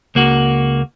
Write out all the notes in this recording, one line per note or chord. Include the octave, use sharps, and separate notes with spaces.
C#2 A#3 F#4